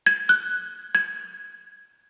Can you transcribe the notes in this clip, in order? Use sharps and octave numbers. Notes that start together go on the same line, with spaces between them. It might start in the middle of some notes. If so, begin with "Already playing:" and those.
G#6
F#6
G#6